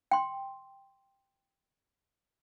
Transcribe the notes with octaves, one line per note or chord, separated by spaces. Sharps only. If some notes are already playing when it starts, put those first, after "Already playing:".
G5 C6